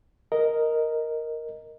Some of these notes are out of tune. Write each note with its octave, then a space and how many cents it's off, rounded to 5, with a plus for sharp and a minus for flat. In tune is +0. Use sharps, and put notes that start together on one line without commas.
A#4 +0 D#5 +0